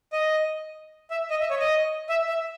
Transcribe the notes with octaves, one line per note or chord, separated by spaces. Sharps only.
D#5
E5
D#5
E5
C#5
D#5
E5
E5